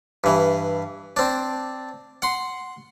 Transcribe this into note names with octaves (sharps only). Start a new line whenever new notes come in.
G2 E3
C4 D4
F#5 C6